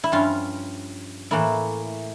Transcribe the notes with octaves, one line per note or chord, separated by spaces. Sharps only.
E4
G2 F3 C#4 F4
A2 E3 A#3 E4